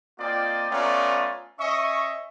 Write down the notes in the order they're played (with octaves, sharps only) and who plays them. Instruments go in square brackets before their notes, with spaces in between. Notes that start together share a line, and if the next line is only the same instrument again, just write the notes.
[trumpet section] A#3 C4 F4 D5 D#5 G5
A3 B3 C#4 F4 D5 A#5
C#4 D#5 E5 C#6